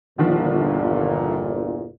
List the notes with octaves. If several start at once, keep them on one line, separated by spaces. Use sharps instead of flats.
G1 E2 A#2 D3 D#3 F3